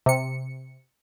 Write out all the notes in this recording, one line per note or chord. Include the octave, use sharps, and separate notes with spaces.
C3 C#7